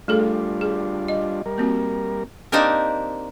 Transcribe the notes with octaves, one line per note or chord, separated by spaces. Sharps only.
G3 A3 D4 F4 G#4 A4
G#4
D#5
G3 A#4
A#3 C4 F#4
A#3 C4 D4 D#4 G4 A#4